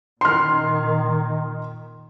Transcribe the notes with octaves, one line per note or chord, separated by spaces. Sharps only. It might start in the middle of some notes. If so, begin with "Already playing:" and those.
A#2 D#3 C6 F6